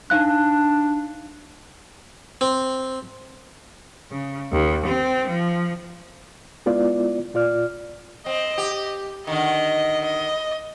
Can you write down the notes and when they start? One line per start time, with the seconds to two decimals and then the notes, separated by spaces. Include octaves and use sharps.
0.10 D4 D#4 F5 F#6
2.41 C4
4.11 C#3
4.52 D#2
4.86 C4
5.28 F3
6.66 G#3 B3 E4 F4 D5
7.34 A#2 F4 D5 F6
8.26 C4 D#5
8.58 G4
9.27 D3 D#3 D#5
10.04 D#5